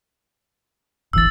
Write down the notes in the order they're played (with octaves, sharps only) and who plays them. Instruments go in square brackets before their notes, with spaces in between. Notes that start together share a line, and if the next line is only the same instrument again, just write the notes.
[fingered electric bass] D1 G1 E3 [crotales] E6 A6